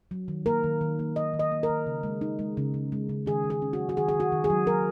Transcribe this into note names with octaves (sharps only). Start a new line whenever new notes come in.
F#3
D#3
A#3 A#4
D#3
D#3
A#3
A#3 D#5
D#3
D#5
A#3
A#4
D#3
C#3
G#3
D#4
G#3
C#3
C#3
G#3
C#3
D#3 G#4
D#3
G#4
C#4
F#4
F#3
F#4
D#3 G#4
G#4
D#3
F#4
D#3
G#4
F#3
F#3 A#4